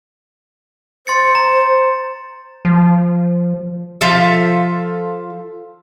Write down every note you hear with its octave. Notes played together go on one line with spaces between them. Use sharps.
C5 C6 A6 C#7
A#5
F3
F3 F4 A4 E5